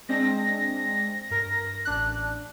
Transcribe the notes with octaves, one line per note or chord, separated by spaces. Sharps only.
G#3 C4 D4 A#6
G2 A#4
A1 D4 F#6